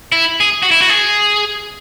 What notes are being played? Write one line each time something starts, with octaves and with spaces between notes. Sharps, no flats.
E4
G#4
F#4
E4
F#4
G#4